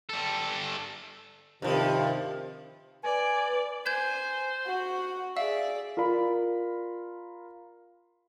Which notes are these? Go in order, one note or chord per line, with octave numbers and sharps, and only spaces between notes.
G3 A4
G2 C3 D#3 F3
B4 D5 G#5
C5 G#5 G6 G#6 E7
F#4 F#5
G#4 D5 E5 F5
F4 A#4 D5 B5